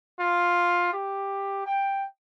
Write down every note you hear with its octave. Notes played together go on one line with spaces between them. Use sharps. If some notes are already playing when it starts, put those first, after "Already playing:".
F4
G4
G5